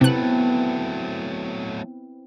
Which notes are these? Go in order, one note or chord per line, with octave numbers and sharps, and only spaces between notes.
C3 F#3 A3 B3 C4 E4 B4 F#6